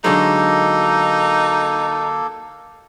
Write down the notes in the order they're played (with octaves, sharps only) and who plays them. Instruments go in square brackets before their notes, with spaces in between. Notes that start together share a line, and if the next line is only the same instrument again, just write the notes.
[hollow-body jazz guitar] D3 F#3 G#3 [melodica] A#3 A4 [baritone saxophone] D#4